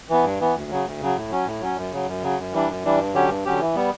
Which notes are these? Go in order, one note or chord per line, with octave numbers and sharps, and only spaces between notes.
E3 B3
G2
E3 B3
D2
C#3 F#3
D2
C#3 F#3
A2
F#3 C#4
A2
F#3 C#4
F#2
C#3 F#3
F#2
C#3 F#3
F#2
E3 G3 D4
F#2
E3 G3 D4
G2
D3 F#3 C#4 G4
G2
D3 F#3 C#4 G4
E3
G3 B3